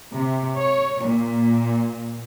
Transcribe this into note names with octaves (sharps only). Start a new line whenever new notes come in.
C3
C#5
A#2